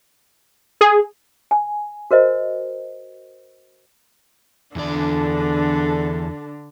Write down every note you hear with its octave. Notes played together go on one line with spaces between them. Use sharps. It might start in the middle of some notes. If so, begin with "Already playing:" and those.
G#4
G#5
F#4 A#4 C5 D#5
E2 D3 D4 A4 D5